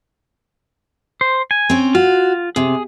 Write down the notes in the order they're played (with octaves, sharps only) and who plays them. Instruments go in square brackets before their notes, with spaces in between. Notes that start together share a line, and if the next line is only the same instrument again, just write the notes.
[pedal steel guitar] C5
G#5
[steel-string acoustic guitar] C4 C#4
[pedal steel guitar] F4 [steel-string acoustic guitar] F#4
[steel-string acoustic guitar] C3 [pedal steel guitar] G#4